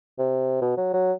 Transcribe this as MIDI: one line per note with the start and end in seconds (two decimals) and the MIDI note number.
0.19 0.61 48
0.62 0.74 47
0.77 0.91 54
0.94 1.13 54